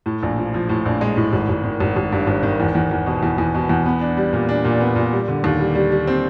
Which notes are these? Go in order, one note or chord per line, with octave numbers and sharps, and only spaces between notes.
A2
A#1
F3
F3
A2
A#1
G#3
A2
G#1
G#1
D#3
G#1
G#1
G2
G#1
D#3
E2
E2
E2
B2
E2
E2
B2
E2
B3
D4
G3
A#2
D4
A#2
B3
A#2
G3
D3
D#2
G3
G3
G3
C4